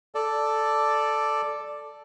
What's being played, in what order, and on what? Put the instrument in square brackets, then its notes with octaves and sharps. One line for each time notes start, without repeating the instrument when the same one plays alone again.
[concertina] A4 D5